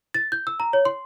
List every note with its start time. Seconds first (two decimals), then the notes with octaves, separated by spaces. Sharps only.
0.14 A6
0.32 G6
0.47 E6
0.60 A#5
0.73 C#5
0.85 C6